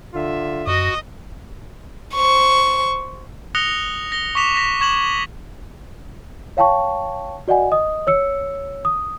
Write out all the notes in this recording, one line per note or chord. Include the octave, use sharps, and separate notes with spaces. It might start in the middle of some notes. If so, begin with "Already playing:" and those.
D3 F4 E5
F#2 F#4 D#5
C5 C#6
D#6 F#6 A#6 C#7 F7 G7
A#6 G7
C#6 D6 B6 E7 F7
C#6 A#6 B6
C#6 G#6 E7 F#7
C#5 F5 G5 A5 C#6
F#4 D5 D#5 F#5 G#5
D#5 D#6
C#5 E6 C#7
D#6